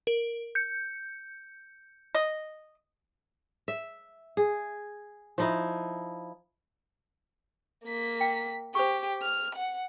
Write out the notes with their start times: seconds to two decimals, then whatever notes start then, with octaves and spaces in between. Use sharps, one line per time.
0.07 A#4
0.55 G6 C#7
2.15 D#5
3.68 E5
4.37 G#4
5.38 F3 D#4 E4
7.85 A#3 B6
8.21 G5
8.75 G4 C5 C#6
9.22 F6
9.55 F#5